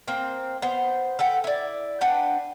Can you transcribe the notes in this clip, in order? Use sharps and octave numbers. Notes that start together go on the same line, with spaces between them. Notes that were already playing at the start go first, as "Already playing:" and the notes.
A#3 C4 G5
B3 C5
A4 B4 F#5 G5
E4 D5
D4 B4 F#5 G5